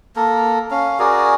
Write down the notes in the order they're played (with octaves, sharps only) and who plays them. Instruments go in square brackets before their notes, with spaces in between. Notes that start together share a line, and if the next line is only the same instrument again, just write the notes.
[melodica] A#3 A4 A#4
C#4 F5
F#4 G#4 A#4 D5